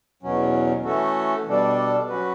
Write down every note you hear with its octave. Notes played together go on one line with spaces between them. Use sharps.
E2 B2 F#3 C#4
E3 A3 C#4 F#4 A4
B2 G3 D4 A4 D5
F#3 C#4 F#4 B4